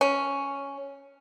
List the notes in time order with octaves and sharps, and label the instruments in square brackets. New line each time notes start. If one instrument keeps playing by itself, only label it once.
[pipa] C#4